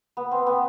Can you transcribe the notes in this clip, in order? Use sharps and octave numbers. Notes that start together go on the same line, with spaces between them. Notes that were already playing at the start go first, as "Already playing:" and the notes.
B3
C4
B3